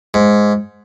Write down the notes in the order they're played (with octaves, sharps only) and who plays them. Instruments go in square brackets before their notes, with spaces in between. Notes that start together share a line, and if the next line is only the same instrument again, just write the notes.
[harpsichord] G#2